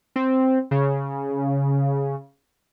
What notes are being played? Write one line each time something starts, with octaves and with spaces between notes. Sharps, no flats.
C4
C#3